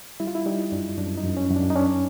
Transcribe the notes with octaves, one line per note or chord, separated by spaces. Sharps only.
G3 E4
F4
E4
G3 D#4
F#2 D4
F#2 D4
D#4
F#2
C#4
F#2
D4
D#4
C#4 D4